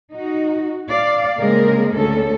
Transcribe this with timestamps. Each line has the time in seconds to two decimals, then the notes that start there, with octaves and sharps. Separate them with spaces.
0.14 D#4 F#4
0.89 D5 F5
1.41 C#3 G#3 A#3 C4 G#4 A#4
1.93 D2 C#4 A4